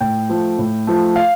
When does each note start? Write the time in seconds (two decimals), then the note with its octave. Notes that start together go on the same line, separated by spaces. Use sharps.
0.01 A2 G5
0.30 F3 A3
0.58 A2
0.87 F3 A3
1.16 F5